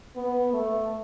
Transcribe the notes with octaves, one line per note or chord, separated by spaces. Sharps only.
B3
A3